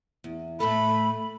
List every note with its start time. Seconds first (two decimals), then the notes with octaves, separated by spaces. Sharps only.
0.24 E2
0.60 A2 A3 A4 B5